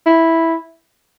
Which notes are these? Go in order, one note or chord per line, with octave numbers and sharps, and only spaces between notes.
E4